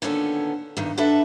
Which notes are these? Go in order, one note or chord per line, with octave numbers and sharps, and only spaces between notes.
A#2 D3 D#3 B3 C#4 A4
E2 G2 D#3
D4 F#4 A4 B4 E5 A5